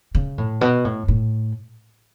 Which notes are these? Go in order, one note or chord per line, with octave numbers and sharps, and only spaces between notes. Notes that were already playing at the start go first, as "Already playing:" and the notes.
C#3
A2
B2
A2
A2